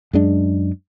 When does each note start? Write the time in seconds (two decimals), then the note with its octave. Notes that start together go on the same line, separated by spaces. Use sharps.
0.13 F#2 G#3 D4